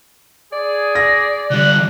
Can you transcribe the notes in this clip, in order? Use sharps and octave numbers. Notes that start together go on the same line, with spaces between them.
G#4 D5
A#6
D3 G3 F#6